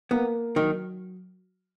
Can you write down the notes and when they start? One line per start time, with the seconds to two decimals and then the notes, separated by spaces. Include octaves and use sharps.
0.11 A#3 B3
0.56 D#3 F#3